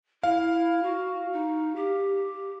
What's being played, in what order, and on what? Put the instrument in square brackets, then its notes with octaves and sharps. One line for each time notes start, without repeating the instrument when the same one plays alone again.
[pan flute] E4 [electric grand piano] F5
[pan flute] F#4
D#4
G4